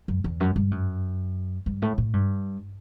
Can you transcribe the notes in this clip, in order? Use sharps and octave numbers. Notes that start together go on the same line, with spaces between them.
F#2
E2
F#2
G2
F#2
G2
A2
A2
G2